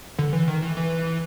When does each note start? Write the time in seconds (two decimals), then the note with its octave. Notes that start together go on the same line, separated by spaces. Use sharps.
0.19 D3
0.33 E3
0.48 D#3
0.62 E3
0.77 E3